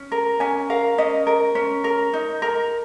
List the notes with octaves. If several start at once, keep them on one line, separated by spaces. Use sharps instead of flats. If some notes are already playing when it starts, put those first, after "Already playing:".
Already playing: C#4
A#4
C#4 G#5
A#4 F5
C#4 D#5
A#4
C#4
A#4
D#4
A#4